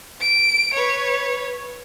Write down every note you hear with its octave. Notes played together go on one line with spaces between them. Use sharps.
D7
B4 C#5